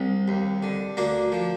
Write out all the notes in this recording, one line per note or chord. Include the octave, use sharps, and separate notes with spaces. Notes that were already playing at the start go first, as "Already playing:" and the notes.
Already playing: C2 C3
D#2
D3
D2 A#3 D4
F3